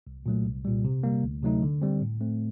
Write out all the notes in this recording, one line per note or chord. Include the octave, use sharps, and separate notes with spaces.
C2
A#2 F#3 A3
C2
A#2 G3
C3
G3 A#3
D2
C3 F#3 A3 D#4
D3
G3 C4
A2
A3 C4